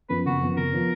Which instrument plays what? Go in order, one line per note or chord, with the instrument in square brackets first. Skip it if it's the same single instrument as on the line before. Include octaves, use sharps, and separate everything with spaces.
[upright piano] F#2 F3 B3 [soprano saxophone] B4
[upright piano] F#1 [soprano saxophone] F#4
[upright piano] F#2 F3 B3
[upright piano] F#1 [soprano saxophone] A#4
[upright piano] F3 B3